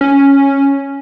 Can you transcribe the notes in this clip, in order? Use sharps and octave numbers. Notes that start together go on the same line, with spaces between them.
C#4